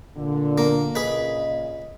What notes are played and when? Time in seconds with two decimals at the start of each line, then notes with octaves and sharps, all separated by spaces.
0.17 A#2 D3
0.58 A#3
0.95 A#2 C#3 G#4 B4 D#5